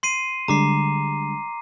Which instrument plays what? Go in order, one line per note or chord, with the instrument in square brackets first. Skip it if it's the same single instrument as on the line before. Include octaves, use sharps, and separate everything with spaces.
[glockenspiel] C6 C7 D#7
[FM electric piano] D3 G3 G#3 [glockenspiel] A#5 D6 C7